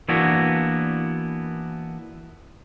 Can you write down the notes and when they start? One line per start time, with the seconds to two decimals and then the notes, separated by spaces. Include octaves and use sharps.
0.08 E3 A#3 B3 D4 E4 F#4